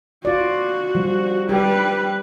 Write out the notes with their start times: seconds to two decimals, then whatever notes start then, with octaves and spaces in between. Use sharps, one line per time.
0.25 F4 F#4 D5
0.95 F3 G3
1.49 G3 G4 B4